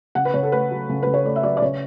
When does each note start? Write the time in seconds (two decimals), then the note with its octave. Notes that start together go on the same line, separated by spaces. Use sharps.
0.15 C#3 F#5
0.25 B4
0.34 C#3 C#5
0.43 A4
0.52 A3 B4
0.71 F#3
0.89 C#3
1.03 C#3 B4
1.14 C#5
1.25 A3 D5
1.36 E5
1.43 F#3 D5
1.57 D5
1.62 C#3 C#5